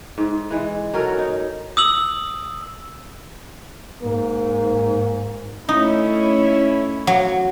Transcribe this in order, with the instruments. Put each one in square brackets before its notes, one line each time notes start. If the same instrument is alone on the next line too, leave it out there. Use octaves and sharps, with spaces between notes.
[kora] G#2
E3 G#3
F#3 C#4 A4 A#4
D#4
[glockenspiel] D#6 E6 F#7
[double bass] G#2 [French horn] A#3
[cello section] A3 C#4 E4 [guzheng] D#4
[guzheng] F#3